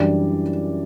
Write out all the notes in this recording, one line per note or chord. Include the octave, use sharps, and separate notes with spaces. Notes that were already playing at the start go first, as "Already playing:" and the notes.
Already playing: F#2 E3 G3 D4 D5